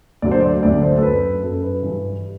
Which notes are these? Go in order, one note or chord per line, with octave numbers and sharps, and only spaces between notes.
D2 D3 F#3 D5
C5
D5
D2 D3 F#3 D5
C5
A4
F#2 F#3 B4
F#2 F#3 A4
B4
G2 E3